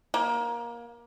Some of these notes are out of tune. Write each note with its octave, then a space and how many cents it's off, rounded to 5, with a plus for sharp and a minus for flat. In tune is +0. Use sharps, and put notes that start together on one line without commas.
A#3 +20